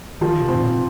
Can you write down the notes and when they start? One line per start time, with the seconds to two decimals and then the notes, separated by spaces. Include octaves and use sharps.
0.21 D#3 F3
0.41 C3
0.48 C4
0.55 G#2
0.62 A#2